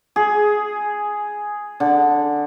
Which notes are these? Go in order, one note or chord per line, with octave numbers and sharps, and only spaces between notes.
G#4
D3